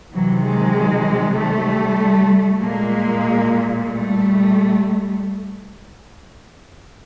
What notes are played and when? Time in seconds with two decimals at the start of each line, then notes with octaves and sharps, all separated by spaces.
0.13 C3 D#3 E3 F#3
0.44 F#3 G#3
1.37 G3 A3
2.60 A#2 G#3 A#3
3.85 G3 A3